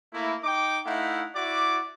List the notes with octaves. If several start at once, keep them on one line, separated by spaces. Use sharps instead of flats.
A3 A#3 E4
D#4 G5 D6
A3 D#4 E4 F5 F#5
E4 F#4 D5 D6